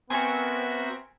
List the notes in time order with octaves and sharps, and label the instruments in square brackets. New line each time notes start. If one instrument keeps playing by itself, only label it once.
[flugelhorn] B3 [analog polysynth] C4 A#4 [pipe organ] F#4 E5 [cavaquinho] G#5 C#6